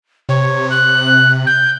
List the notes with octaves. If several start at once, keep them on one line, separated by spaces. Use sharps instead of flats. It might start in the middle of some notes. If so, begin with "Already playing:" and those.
C3 C#5
F#6
G6